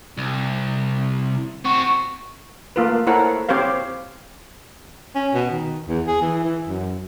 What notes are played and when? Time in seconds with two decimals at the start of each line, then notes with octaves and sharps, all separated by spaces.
0.18 C2
1.65 C4 F#4 C#6
2.76 A3 A#3 F4 B4
3.07 E4 A4 A#4 C5 C#5 F#5
3.49 C4 G4 C5 C#5 F5
5.15 C#4
5.34 B2
5.51 D#3
5.88 E2
6.07 G#4
6.22 E3
6.44 E3
6.67 F#2